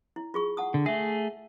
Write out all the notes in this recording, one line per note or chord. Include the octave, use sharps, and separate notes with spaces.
E4
F4 G#4 C#6
F#5 A5 D#6
D3
A3 G#4 E5